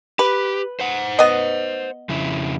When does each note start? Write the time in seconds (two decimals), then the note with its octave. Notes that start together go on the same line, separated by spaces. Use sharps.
0.19 G4 B4
0.80 C5 F#5
1.19 B3 D#5
2.09 F2 C#3 E4